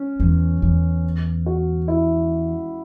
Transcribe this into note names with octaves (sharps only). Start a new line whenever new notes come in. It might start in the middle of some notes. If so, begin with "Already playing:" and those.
Already playing: C#4
E2
E2
F#4
E4